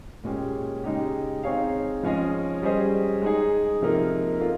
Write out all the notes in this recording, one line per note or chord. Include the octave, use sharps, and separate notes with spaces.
A#2 G#3 C#4 G4
C#3 G#3 D#4 G4
C4 D#4 G#4 C#5 F5
F3 G#3 C#4 G#4 D#5
G3 C#4 G#4 C5 D#5
G#3 D#4 G#4
C3 F3 A#3 D#4
A#3 F4